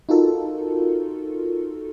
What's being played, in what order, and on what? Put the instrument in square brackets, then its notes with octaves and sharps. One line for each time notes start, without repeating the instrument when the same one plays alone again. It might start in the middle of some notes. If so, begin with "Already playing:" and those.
[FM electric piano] D#4 F4 F#4 A4 A#4